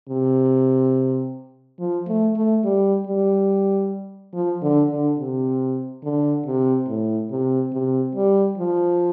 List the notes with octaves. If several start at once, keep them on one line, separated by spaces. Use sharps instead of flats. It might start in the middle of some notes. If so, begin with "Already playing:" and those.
C3
F3
A3
A3
G3
G3
F3
D3
D3
C3
D3
C3
A2
C3
C3
G3
F3